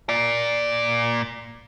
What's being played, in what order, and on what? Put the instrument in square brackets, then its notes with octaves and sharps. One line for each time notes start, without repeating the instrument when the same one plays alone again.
[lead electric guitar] A#2 D5